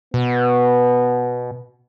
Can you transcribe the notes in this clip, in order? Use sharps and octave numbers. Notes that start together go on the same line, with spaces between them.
B2 B3